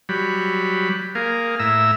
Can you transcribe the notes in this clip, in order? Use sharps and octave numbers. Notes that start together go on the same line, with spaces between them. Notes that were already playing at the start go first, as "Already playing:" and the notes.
F#3 G3 B5
A#3 G#4 A#4 F5
A2 E5 A#5 E6